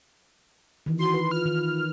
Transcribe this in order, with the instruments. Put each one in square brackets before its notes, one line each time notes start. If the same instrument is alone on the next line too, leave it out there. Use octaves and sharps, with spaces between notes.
[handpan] D#3 E3
[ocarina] F#4 [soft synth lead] C6
[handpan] B4
[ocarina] F4 [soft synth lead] F6
[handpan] D#3